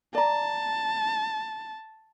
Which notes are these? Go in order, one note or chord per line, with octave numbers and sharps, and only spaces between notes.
D5 A5 A#5